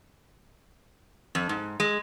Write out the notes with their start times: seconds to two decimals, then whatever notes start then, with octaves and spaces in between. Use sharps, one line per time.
1.35 F2
1.49 G#2
1.80 G#3